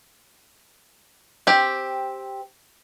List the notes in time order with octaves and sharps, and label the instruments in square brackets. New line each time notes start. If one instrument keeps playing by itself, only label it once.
[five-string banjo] C4 G4